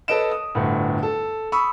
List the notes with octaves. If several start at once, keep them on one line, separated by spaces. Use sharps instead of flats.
A4 B4 C#5 D#5 D7 E7
D#6
G1 D2 A2
A4
B5 C#6 D#6 E6